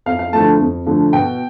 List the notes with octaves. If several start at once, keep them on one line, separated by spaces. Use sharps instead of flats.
F2 F5
F5
D3 F3 A3 A5
F2
D3 F3 A3
B2 G5